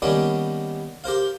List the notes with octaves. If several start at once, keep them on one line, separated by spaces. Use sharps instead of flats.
D#3 G3 A#3 B3 C#4
G4 A#4 C5 F5